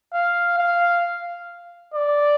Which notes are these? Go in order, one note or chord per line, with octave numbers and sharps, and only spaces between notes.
F5
F5
D5